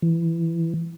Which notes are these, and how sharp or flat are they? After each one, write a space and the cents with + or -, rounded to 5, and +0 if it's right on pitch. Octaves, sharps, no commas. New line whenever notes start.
E3 +15